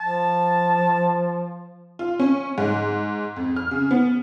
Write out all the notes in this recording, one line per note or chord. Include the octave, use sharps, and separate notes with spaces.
F3 A5
F4
C#4
G#2
F2
F6
C#3
B3